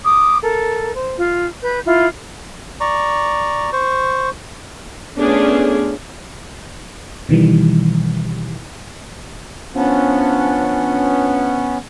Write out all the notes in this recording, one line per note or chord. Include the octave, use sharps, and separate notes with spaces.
D6 D#6
A4 A#4
C5
F4
B4 G6
E4 F4
D5 A#5 C#6
C5 C#6
A3 B3 C#4 D4 F4 G#4
B2 D#3 E3 G3
F3 B3 C#4 D4